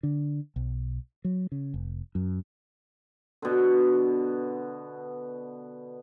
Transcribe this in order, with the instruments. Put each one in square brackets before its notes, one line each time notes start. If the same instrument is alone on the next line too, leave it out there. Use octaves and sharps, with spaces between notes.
[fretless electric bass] D3
B1
F#3
C#3
F1
F#2
[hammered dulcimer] B2 D3